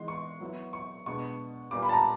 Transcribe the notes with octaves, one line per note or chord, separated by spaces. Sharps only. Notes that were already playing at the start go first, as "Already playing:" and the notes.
Already playing: E3 G#3 B3 D#4 C6
C#6
F#3 B3 E4
C#6
B2 G#3 B3 D4 C#6
A#2 G3 B3 D6
B5
A5
A#5